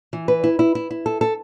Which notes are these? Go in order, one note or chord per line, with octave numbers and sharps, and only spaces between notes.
E3
B4
E4
E4
E4
E4
A4
A4